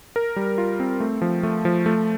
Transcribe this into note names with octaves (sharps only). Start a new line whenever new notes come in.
A#4
G3
F4
C4
A3
F3
A3
F3
A3